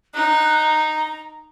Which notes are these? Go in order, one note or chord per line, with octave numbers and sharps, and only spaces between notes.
D#4 F#6
A#5